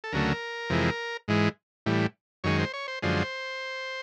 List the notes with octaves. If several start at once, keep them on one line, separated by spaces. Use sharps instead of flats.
A4
D2 C#3 F#3 A3 A#4
F2 C3 E3 G#3
G#2 E3 G#3
A2 E3 G3
F#2 D#3 G#3 C#5
C5
C#5
C5
F#2 D3 F3 G#3 C5